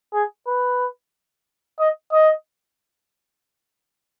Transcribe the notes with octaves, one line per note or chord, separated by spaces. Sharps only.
G#4
B4
D#5
D#5